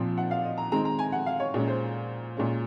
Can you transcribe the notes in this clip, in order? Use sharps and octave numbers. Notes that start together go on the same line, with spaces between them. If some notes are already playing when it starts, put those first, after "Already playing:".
Already playing: A#2 F3 C4
F#5
F5
D#5
A#5
D#3 G#3 C4 A#5
A#5
G#5
F#5
F5
C#5
A#2 G#3 C#4
C5
A#2 G#3 C#4